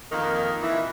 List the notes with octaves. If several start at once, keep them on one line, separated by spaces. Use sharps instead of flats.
F2 D#3 A#3 D#4 A#4
A#2 E3 E4